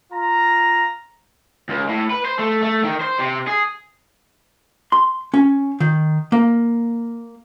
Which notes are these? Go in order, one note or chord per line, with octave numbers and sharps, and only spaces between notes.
F4 A#5
C#2
A2
B4
C5
A3
A3
D#3
C5
C3
G#4
C6
C#4
D#3
A#3